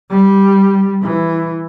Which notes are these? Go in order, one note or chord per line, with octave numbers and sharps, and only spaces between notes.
G3
E3